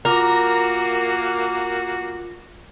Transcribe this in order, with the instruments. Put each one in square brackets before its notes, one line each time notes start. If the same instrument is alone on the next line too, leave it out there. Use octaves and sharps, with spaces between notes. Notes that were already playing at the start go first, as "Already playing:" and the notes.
[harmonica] A#3 F#4 [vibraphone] F4 D6 [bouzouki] A#4